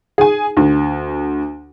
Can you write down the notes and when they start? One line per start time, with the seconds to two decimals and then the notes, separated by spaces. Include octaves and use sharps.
0.18 G#4 G#5
0.57 D2